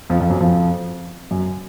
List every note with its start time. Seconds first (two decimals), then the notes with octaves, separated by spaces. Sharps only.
0.10 F2 F3
0.20 F2 F3
0.30 F#2 F#3
0.41 F2 F3
1.31 F#2 F#3